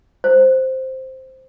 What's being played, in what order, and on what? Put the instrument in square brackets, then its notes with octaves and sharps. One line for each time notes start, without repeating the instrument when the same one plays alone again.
[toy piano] C5